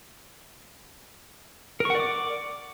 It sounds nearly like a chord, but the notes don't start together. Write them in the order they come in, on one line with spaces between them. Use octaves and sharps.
A#4 C#6 F#5 D5 D6